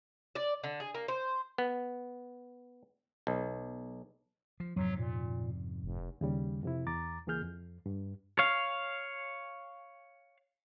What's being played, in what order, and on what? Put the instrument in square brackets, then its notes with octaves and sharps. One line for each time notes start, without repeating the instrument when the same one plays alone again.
[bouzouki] D5
D3
G#4
A#3
C5
[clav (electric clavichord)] B3
B1
[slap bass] F3
[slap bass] F2 G#2 C3 [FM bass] F#3
[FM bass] A#2
F1
[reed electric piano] D#2 C#3 G3
F2 C3 E4
E2 A#5 D6 A6
C#2 E3 A#3 G#4 F6 G6
F2
G2
[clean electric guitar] C#5 F5